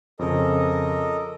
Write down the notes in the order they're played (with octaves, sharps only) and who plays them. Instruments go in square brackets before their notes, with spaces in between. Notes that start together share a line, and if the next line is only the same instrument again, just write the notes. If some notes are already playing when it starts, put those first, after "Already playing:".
[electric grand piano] F2 C#3 [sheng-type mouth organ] A4 A#4 D#5